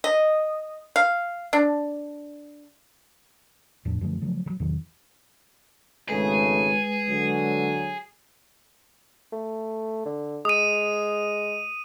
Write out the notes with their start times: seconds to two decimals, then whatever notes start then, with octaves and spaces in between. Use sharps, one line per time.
0.04 D#5
0.96 F5
1.53 D4
3.85 E2 A2 F3 D4
4.01 F#2 D3 F3 A3
4.21 C#3 F3 F#3 A3
4.46 D#3 F#3
4.60 E2 C3 D#3 F#3
6.09 G#1 C#3 G#3 A3 G#4 B4
7.08 D3 F#3
9.32 A3
10.05 D3
10.45 G#3 D#6 D#7